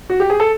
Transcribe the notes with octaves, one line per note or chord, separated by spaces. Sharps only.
F#4
G4
G#4
A4